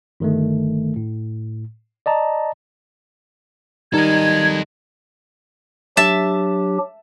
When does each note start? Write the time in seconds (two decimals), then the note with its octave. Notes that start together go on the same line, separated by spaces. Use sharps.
0.20 G1 D#3 A3
0.96 A2
2.06 D5 D#5 A5 A#5
3.94 D#3 G3 D#4 A4 D#5 G#6
5.97 F#3 D4 G4 E5 A5